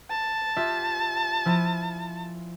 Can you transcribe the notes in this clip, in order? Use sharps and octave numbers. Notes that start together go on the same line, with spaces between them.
A5
F4 G4 E5
F3 E4 G#5